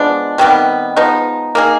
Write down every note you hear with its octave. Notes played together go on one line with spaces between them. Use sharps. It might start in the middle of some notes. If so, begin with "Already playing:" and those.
Already playing: F3 G#3 B3 D4
C3 D#3 G3 B3
F3 G#3 B3 D#4
A#3 D#4 G#4